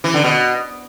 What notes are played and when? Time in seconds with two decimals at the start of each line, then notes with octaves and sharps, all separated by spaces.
0.04 E3
0.14 D3
0.24 B2